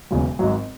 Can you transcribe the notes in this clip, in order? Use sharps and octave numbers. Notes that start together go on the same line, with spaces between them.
E1 E2 C#3 F#3
G#1 G#2 F#3